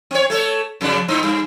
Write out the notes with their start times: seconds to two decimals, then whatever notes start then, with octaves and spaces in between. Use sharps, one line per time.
0.11 C4 C#5
0.30 A3 A4 C#5
0.81 F2 C#3 D4
1.08 G#2 C4 D#4
1.23 G2